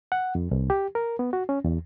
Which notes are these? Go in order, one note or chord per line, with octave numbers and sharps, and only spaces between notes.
F#5
F2
C2
G4
A#4
B3
F#4
C#4
E2